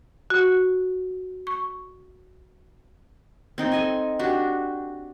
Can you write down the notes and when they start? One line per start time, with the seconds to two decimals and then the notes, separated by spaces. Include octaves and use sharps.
0.30 F#4
1.47 C#6
3.58 C4 D#4 G5
3.72 A4 D#5 G#5
4.19 D4 F#4 G4